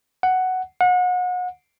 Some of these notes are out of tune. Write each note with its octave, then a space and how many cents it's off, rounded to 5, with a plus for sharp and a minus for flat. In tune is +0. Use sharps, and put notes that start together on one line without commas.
F#5 +5
F#5 -35